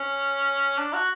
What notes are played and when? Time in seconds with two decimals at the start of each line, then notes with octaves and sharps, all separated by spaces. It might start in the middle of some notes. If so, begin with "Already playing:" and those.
Already playing: C#4
0.78 D4
0.93 F#4